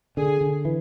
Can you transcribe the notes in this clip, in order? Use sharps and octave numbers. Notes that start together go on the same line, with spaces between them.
D3 G#4
D3
E3